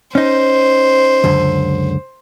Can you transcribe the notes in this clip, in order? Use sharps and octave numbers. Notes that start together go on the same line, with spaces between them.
C#4 D#4 C5
C#2 F#2 D3